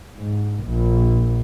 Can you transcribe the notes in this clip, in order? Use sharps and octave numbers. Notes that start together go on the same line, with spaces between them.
G#2
A#1